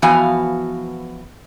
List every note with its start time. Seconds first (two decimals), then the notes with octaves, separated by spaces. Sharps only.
0.02 E3 F3 B3 F#4 F5 G#5